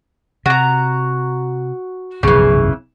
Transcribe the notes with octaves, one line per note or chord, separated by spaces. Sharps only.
C3 F#4 A#5
F1 B1 G2 C#3 E3